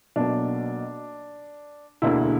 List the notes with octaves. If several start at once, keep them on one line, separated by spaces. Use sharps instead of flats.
B1 B2 F#3 A#3 D4
E1 D2 D3 A#3 E4